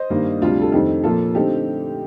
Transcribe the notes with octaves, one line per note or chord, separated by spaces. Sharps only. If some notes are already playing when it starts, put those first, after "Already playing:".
Already playing: C5 D#5
G2 D#3 A#3
D2 C3 G3 D4 F4
A4
F2 D#3 A3 C4 D#4 G4
A#2 F3 A#3 F4 A4
D3 A3 C4 D#4 G4